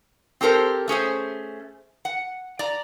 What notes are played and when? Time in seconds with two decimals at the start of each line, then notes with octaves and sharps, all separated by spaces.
0.41 C4 G4 A4 A#4 C5
0.88 A3 C#4 G#4 C5
2.05 F#5
2.59 D5 A#5